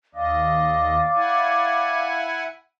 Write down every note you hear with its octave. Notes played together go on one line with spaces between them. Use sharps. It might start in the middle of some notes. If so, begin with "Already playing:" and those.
D#2 D5 D#5 F5
E4 F#5 G#5